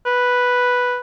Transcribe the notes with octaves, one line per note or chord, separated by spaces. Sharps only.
B4